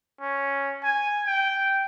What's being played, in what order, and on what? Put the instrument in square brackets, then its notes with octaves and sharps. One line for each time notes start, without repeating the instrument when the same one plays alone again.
[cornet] C#4
G#5
G5